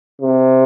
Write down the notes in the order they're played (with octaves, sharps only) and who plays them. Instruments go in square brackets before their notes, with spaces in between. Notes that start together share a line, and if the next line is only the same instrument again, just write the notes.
[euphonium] C3